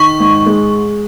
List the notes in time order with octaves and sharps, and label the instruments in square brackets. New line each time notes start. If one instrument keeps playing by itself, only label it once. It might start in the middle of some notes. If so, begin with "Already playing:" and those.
Already playing: [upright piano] D#3 [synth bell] C#6
[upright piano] G#2
G#3